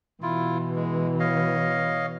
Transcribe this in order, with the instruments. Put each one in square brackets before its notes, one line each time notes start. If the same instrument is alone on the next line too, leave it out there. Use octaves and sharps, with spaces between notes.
[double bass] B2 E3 [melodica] E4 F4
[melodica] G#3
C#5 D#5 F5